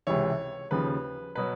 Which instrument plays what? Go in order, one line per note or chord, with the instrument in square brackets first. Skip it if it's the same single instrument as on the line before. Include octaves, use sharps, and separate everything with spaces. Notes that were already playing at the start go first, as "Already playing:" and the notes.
[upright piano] C#2 C3 E3 C#5
D#2 C#3 F3 B4
B2 F#3 B4